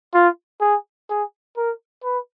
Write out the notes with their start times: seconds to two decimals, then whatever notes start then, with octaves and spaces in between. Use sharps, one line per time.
0.14 F4
0.61 G#4
1.09 G#4
1.57 A#4
2.04 B4